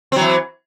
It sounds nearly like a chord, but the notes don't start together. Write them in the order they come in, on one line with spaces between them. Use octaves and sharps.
C4 F#3 E3